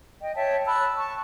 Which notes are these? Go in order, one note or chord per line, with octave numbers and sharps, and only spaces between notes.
D#5 G5
C#5 E5 G5 A5
A5 B5 E6 F#6
A5 C#6